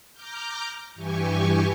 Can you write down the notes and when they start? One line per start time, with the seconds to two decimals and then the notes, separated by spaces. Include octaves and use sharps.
0.13 A#5 D6 F6 G6
0.95 G2 E3 G4 G#5 C#6